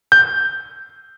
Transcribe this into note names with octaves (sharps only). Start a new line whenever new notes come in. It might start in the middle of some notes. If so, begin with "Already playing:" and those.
G6